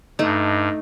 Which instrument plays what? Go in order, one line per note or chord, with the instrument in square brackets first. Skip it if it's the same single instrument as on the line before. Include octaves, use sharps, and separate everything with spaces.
[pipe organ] G2 [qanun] A3 D#4